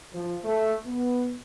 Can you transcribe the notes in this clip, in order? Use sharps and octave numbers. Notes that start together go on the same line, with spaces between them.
F3
A3
B3